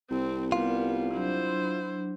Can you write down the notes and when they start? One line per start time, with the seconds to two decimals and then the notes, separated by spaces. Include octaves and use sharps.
0.11 C2 C4
0.52 G3 B3 F4 A#4
1.15 F#3 D4 E4 C5